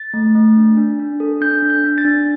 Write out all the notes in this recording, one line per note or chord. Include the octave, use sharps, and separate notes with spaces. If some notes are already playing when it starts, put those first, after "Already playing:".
Already playing: A6
A3
A3
D4
D4
D4
A4
D4 G6
D4
G6
D4
A6
D4